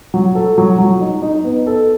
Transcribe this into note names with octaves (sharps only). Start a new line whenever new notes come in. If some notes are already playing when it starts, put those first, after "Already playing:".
F#3
A4
F#3
F#3
D#4
D#4
B3
A4